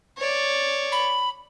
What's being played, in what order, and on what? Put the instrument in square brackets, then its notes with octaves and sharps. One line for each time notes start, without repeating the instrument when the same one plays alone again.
[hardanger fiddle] C#5 D5
[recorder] B5